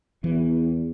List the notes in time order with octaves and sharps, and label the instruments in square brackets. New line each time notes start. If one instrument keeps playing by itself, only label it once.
[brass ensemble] E2 [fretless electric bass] E3